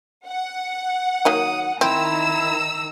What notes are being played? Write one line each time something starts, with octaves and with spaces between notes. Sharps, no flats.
F#5
D#3 F#3 A#3 D#6
D#3 C4 E4 A#5 E6